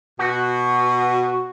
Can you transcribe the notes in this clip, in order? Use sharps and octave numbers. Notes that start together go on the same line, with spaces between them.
B2 F#4